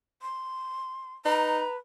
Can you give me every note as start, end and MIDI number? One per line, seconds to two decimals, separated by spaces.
0.22 1.14 84
1.26 1.62 63
1.26 1.78 71
1.26 1.72 82